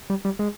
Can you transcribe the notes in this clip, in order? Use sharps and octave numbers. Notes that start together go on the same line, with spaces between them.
G3
G3
G#3